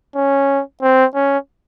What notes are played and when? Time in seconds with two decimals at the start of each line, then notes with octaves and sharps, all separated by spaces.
0.16 C#4
0.82 C4
1.15 C#4